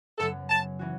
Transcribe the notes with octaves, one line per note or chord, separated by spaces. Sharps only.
F#2 C#3 F#3 B3 A4
A5
E3 C#4 F#4